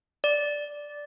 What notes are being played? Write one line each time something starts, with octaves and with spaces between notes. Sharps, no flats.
D5